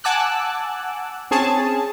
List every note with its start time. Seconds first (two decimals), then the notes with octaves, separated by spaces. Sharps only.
0.04 F#5 G#5 A5 D6 E6 F#6
1.31 C4 C#4 G#4 G#5 A5